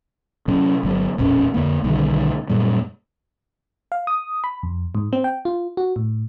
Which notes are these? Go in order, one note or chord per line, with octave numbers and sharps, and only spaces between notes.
C3 F#3 C#4
G1 F#3
E1 A#1 F2 C#4
F2 D3 A#3
B1 D3 D#3 G3
F#2 A#2 G3
F5
D#6
B5
F2
G#2
C4
G5
F4
F#4
A2